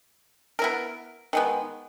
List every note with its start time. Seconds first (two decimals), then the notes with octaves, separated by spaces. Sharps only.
0.59 B3 E4 A#4
1.33 D#3 G#3 B3